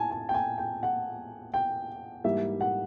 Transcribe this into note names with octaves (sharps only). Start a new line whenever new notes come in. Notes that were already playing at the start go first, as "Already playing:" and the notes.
Already playing: A2 G#5 A5
G#5
G5
G#5
G5
F#5
G5
G#2 E3 G3 A#3 E5
F#5